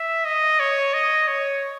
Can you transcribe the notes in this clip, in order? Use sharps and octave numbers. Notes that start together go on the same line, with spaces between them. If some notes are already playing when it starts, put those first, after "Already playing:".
Already playing: E5
D#5
C#5
D#5
C#5